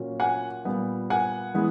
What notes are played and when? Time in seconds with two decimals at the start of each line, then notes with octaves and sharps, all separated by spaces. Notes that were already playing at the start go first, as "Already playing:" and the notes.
Already playing: A#2 F#3 A#3 C#4
0.20 F#5 G#5
0.65 A#2 G3 B3
1.10 F#5 G#5
1.54 E3 G#3 B3